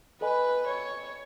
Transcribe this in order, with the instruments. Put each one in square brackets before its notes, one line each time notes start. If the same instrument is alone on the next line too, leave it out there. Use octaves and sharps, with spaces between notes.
[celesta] A4 D#5 G#5 B5 [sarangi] B4
[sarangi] C#5